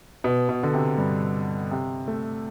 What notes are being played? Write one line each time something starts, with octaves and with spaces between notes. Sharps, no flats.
B2
B2
D3
C3
G2
C3
A3